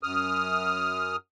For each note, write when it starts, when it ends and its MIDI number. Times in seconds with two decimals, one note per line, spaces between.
0.03 1.16 42
0.03 1.16 87
0.03 1.16 89